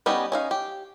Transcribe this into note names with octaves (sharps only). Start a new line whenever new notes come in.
G3 B3 C#4 D#4 G4
C#4 D#4 F5
G4